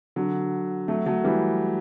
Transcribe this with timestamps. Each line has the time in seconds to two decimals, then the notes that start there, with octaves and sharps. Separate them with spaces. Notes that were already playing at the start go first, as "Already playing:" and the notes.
0.16 D3 F#3
0.88 F#3 A3
1.06 F#3 A3
1.24 E3 G3